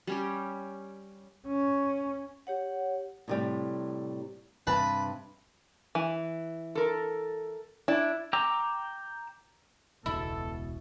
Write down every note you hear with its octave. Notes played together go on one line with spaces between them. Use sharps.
G3 C#4 G4
C#4
G4 C#5 F#5
A2 C3 G3
G2 C3 B4 A5
E3
A4 A#4
D4 E4
G5 A#5 D6 E6
E1 C#2 B2 E4 A4